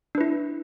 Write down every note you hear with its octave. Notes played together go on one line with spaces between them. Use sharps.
D4 E4 B4